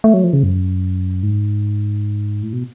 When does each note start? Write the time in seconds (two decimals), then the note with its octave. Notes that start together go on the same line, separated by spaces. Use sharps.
0.04 A3
0.14 F#3
0.24 F3
0.33 C#3
0.43 F#2
1.23 G#2
2.43 A2
2.53 B2